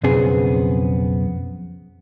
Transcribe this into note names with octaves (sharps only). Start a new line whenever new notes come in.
B1 F2 C#3 B3 C4 G#4